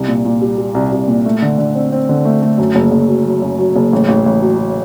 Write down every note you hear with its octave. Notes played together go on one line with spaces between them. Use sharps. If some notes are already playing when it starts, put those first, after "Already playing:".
Already playing: C2
A#2
A#2
G3
G3
C2
C2
A#2
A3
D3
D3
C4
C4
D3
A3
A3
F#2
F#1
F#1
F#3
F#3
F#2
F#3
F#1
A1
A1
A1
F#3
F#3